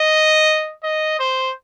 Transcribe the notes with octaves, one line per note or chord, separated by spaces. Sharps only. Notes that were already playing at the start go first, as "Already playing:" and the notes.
Already playing: D#5
D#5
C5